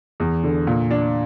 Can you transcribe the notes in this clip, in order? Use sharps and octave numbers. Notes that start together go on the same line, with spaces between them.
E2
D3
A#2
D4